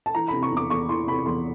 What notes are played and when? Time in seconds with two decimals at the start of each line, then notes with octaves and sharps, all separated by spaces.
0.06 A5
0.15 E3 A#5
0.28 C3 B5
0.43 C#6
0.52 E2 D6
0.70 E2 C#6
0.89 E3 C6
1.07 C3 B5
1.26 E2 C6